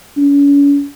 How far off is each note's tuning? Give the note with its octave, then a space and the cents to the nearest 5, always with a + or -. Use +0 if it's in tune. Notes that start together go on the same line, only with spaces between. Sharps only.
C#4 +40